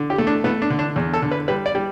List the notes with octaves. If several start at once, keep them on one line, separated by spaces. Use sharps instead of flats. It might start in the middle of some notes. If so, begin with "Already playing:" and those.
Already playing: D3
G4
A3
D4
A3 B3
D4
D3
D4
E2
A4
D3
B4
G3 B4
D5
G3